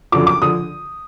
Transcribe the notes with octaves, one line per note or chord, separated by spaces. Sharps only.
F#2 D3 F3 D6
D6
D3 F3 D#6